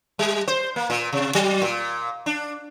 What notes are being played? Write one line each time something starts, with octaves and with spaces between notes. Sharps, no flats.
G3
C5
A#3
A#2
C3
F#3
A#2
D4